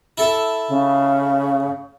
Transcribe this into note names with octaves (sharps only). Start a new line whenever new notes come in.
E4 A4
C#3